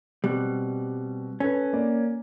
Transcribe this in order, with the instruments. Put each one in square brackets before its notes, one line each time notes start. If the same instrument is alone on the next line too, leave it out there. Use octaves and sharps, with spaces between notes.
[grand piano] B2 C4 F#6 [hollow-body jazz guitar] G3
[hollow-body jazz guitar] C#4 [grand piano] A4 B4
[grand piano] A#3 D5